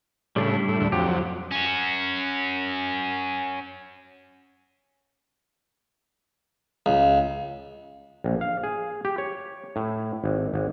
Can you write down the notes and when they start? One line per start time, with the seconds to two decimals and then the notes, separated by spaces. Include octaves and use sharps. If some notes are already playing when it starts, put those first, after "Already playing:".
0.36 A2 C#3 G3 D4 E4
0.68 A2
0.80 D2 A2
0.92 F2 F#3 G4
1.08 F3
1.52 C#4 F#4
6.86 C#2
8.24 A#1
8.41 F5
8.63 G#4
9.05 G4
9.18 C#5
9.76 A2
10.24 G#1
10.54 G#1